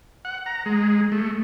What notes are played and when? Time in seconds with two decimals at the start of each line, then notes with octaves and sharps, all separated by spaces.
0.25 F#5
0.46 A#5
0.66 G#3
1.12 A3